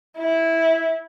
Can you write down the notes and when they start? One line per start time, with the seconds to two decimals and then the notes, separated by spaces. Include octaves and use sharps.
0.18 E4